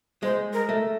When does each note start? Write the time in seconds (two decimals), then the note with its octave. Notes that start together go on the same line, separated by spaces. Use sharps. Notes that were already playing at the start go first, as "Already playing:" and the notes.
0.23 G#3 C5
0.53 A#4
0.69 A3